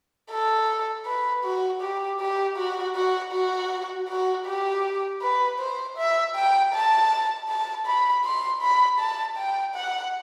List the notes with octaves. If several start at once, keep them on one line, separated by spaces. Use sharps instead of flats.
A4
B4
F#4
G4
G4
F#4
F#4
F#4
F#4
G4
B4
C5
E5
G5
A5
A5
B5
C6
B5
A5
G5
F#5